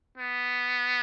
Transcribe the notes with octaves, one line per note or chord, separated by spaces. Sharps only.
B3